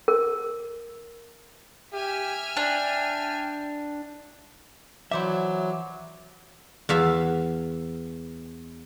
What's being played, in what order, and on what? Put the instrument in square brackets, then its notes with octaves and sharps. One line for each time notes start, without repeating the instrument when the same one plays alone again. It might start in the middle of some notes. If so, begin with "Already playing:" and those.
[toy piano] A#4
[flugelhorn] G4 [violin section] E5 G#5 F6
[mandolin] D4 [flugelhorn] G5
[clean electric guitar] E3 E5 [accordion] F#3 [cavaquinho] E4 C5 D5
[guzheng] E2 E5 F5 A5